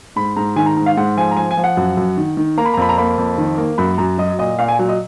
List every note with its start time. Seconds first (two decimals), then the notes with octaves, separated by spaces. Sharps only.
0.16 G#2 B5
0.36 G#2 A#5
0.56 D#3 G#5
0.66 A#5
0.76 G#2 A#5
0.86 F5
0.97 G#2 F#5
1.17 F3 G#5
1.31 A#5
1.37 F3 G#5
1.51 G#5
1.57 F3
1.64 F#5
1.77 F#2
1.97 F#2
2.17 D#3
2.37 D#3
2.58 A#3 A#5
2.65 B5
2.74 A#5
2.77 F2 B5
2.89 A#5
2.98 A#3 B5
3.18 F2
3.38 D#3
3.58 A#3
3.78 F#2 B5
3.98 F#2 A#5
4.18 F#3 D#5
4.39 A#2 D#5
4.59 A#2 F5
4.68 G#5
4.79 F#3
4.89 D#5